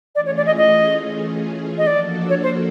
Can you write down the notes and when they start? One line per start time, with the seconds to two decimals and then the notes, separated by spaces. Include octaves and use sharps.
0.15 E3 A3 C#4 F4 G#4 D5
0.26 C#5
0.36 D5
0.46 D#5
0.57 D#5
1.78 D#5
1.86 F3 A#3 D4 F#4 A4 D5
2.29 C#5
2.43 C5